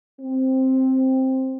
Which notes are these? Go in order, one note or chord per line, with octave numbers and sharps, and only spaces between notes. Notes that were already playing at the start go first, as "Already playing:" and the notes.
C4